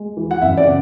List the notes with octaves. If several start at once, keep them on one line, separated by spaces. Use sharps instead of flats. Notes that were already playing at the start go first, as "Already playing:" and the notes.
Already playing: G#3
E3
F#5
F#2 E5
D5
C#3